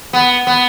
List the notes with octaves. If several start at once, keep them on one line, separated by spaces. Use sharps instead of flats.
B3
B3